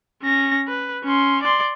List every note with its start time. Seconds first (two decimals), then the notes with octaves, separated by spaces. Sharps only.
0.22 C#4 A#6
0.68 B4
1.04 C#4 C6
1.43 D5 C6